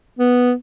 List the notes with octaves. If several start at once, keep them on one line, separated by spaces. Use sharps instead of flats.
B3